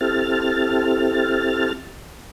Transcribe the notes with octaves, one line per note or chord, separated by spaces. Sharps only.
C4 E4 G4 A4 F6 A6